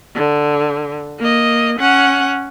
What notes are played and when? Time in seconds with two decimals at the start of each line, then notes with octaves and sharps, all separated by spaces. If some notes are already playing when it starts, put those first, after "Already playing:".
0.15 D3
1.19 A#3 D#5
1.79 C#4 F#5